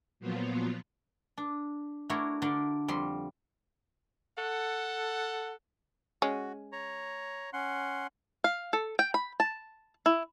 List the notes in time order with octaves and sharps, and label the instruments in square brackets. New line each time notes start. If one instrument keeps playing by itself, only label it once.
[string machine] A#2 F3 F#3 B3 F4
[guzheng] D4
A3 D4 E4 F#4 A#4 C#5
D3 D4 A#4 D5
F2 G3 C6
[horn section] A4 F#5
[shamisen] G#3 C#4 [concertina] F#4
[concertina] C#5 A#5
C#4 F#5 C6
[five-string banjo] F5
A4
G5
B5
A5
E4